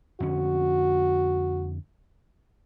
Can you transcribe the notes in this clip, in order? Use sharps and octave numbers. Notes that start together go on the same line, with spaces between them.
F2 D3 C#4 F#4